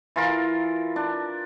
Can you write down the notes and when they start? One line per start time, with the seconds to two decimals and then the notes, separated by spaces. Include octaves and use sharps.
0.16 E3 F4 A#4
0.96 D4